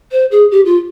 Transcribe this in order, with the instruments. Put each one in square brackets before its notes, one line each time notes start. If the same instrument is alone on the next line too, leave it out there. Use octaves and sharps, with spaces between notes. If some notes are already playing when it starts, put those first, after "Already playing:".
[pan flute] C5
G#4
G4
F4